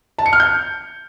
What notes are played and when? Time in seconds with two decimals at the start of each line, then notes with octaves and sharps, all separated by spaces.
0.19 A5
0.26 C#7
0.33 F6
0.40 G6